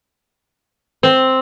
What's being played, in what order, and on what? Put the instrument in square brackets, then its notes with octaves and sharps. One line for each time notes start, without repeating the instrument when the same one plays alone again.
[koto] C4